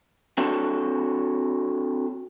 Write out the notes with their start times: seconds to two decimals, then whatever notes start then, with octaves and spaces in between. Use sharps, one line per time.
0.38 C4 D4 F#4 A4